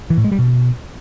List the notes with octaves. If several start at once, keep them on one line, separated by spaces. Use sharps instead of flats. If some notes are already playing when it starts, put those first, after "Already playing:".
E3
A2
G#3
G3
B2